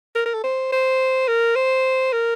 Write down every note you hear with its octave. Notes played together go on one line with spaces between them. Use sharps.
A#4
A#4
A4
C5
C5
A#4
C5
A#4